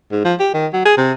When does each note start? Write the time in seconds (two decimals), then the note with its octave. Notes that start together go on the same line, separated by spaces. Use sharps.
0.12 G#2
0.25 F3
0.40 G4
0.54 D#3
0.73 F#3
0.86 G#4
0.97 C3